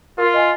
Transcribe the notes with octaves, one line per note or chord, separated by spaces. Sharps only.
F4 A#4
D#5 G#5 C6